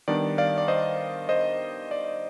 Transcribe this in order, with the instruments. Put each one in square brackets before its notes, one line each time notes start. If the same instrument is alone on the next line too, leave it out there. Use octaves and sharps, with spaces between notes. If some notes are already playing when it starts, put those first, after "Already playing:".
[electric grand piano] D#3 G3 B3 D4 D5
D5 F5
D5
C5 D#5
C5 D#5
D5